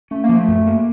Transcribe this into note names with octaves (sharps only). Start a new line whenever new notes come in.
A3 C#4
A#3
F3
A3
F#2
A#3